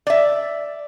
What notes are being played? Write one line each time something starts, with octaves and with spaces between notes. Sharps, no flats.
D5 E5